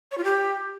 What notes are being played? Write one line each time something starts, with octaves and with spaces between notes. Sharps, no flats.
C#5
F4
G4